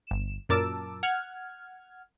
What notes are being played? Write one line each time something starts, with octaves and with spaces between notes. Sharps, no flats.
G1 E7
F#2 A#2 A#4 A5 D6 E6
F#5 F6 G#6